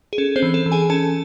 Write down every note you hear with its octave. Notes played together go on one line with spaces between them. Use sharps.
G#4
C#4 A4
C4 C5
E3
A4
E3
G#4 G#5
C#4 A4 A5